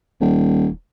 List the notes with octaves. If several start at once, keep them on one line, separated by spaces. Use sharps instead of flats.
D#1